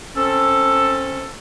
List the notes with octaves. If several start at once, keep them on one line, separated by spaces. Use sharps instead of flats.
C4 C#4 A4